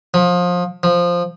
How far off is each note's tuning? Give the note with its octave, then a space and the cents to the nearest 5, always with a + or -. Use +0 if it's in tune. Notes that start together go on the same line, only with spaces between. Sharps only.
F3 +25
F3 +0